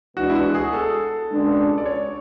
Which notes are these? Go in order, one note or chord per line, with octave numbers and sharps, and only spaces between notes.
E2 B2 G#3 D4 F#4
E4
F#4
G#4
A4
C#2 B2 G#3 D4
D5
C#5